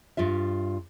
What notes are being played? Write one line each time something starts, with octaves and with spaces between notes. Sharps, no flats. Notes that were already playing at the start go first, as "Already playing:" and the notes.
G2 G3 F4 E5